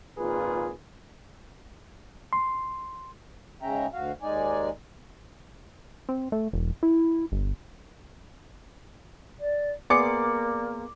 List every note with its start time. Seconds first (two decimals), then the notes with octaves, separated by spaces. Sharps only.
0.18 G#1 A#2 F4 G#4 B4
2.33 C6
3.62 G#2 C#3 C#4 E5 G5 A#5
3.94 D2 F#4 F5
4.22 D#2 G#3 D#4 D5 G#5
6.09 C4
6.32 A3
6.53 E1
6.83 E4
7.32 G1
9.40 D5
9.90 A#3 B3 G#4 D5 C6 D6 C#7